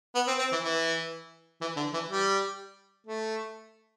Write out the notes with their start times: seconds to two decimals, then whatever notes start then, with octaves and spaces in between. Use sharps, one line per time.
0.16 B3
0.28 C4
0.39 C4
0.52 E3
0.64 E3
1.61 E3
1.77 D3
1.94 E3
2.09 G3
3.07 A3